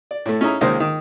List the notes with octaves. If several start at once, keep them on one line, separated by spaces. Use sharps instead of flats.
D5
A2 A3
C#4 D#4 E4 G#4 E5 A#5
C#2 D#3 G#3 A#3 C5
D#3